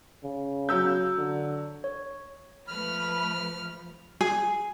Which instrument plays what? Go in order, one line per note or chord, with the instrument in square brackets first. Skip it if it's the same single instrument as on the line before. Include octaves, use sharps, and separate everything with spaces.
[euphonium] C#3
[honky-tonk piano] F#3 E6 G6
[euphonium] D3
[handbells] C#5
[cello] F3 [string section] A3 B4 B5 [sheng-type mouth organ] F6
[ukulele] G#4